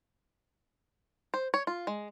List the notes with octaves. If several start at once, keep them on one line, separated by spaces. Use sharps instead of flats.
C5
C#5
F4
G#3